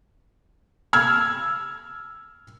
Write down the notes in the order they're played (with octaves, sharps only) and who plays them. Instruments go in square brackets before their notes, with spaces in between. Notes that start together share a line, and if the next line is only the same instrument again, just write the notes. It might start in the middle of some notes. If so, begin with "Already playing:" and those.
[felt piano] E6 F6 G#6